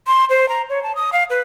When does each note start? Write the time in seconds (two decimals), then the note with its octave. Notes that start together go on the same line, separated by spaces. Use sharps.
0.07 C6
0.30 C5
0.49 A#5
0.70 C#5
0.83 A5
0.95 D#6
1.13 F5
1.30 B4